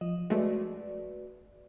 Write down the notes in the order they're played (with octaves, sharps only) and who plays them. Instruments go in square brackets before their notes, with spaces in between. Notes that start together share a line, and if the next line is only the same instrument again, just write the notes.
[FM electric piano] F3 D#5
[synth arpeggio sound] G#3 A3 [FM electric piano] F#4 B4 D5